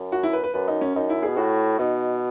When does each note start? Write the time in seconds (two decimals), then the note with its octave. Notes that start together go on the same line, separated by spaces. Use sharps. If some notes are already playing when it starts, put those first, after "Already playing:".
Already playing: F#2
0.12 F#4
0.23 E4
0.33 B4
0.44 B4
0.54 F#2 B4
0.68 D#4
0.81 C#4
0.96 F#2 D#4
1.10 E4
1.23 B2 G#4
1.37 A2 F#4
1.79 B2 D#4